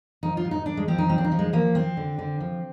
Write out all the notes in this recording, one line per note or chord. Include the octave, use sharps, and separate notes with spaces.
F3 D#4
F4
G#2
D#4
G#2 D4
G#3
F3 C4
D#4
F3 C4
D4
D#4
F3
G#3
F3 A#3
F3 C4
D3
D3
F3